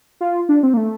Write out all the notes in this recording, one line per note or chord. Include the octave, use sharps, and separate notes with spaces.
F4
D4
C4
A#3
A3